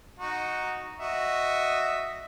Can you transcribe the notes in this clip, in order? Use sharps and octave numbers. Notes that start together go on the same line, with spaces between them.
D#4 F#4
F#4 D#5 E5